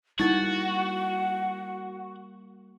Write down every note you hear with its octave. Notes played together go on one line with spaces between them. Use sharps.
G3 G#3 A#3 D#4 E4 F#4 F#5 A6